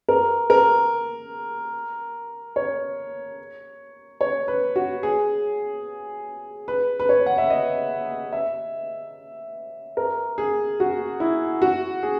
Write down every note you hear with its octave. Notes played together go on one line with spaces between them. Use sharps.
A#4
A#4
C#5
C#5
B4
F#4
G#4
B4
B4
C#5
F#5
E5
D#5
E5
A#4
G#4
F#4
E4
F#4
G#4